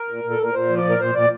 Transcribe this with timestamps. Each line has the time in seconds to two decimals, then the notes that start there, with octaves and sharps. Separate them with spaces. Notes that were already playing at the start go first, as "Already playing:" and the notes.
Already playing: A#4
0.09 A#2
0.24 A#2
0.30 A4
0.39 A#2 A#4
0.54 A#2 C5
0.69 F3
0.77 D5
0.84 A#2
0.90 A#4
0.99 A#2 C5
1.15 A#2 D5